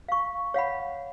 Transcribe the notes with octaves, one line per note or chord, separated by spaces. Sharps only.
F5 C#6
C#5 F5 F#5 B5